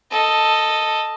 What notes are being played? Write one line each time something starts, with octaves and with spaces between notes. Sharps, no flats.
A4 D#5